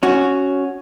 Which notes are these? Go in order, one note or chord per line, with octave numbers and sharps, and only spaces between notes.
C#4 F#4